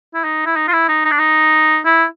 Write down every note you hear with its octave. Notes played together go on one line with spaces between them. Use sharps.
E4
D#4
E4
D#4
F4
E4
D#4
D#4
D4
D#4
E4